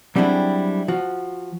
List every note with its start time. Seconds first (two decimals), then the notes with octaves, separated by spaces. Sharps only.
0.16 F#3 G3 C4 D4 E4 G#4
0.88 F3 F#4